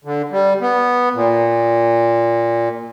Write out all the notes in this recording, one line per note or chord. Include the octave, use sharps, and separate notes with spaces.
D3
G3
B3
A#2